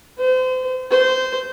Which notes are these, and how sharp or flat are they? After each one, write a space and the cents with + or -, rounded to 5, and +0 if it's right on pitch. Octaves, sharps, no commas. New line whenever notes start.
C5 -35
C5 -15